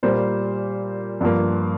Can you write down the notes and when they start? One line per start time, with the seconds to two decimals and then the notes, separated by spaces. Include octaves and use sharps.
0.03 A#2 G3 A#3 C5
1.21 G2 F3 A#3